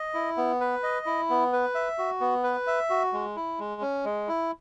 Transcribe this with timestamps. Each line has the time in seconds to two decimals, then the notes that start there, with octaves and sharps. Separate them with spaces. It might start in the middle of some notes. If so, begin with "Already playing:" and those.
Already playing: D#5
0.14 E4
0.37 B3
0.61 B4
0.83 D#5
1.06 E4
1.30 B3
1.53 B4
1.75 E5
1.98 F#4
2.21 B3
2.44 B4
2.67 E5
2.90 F#4
3.13 G#3
3.36 E4
3.59 G#3
3.81 C#4
4.05 G#3
4.28 E4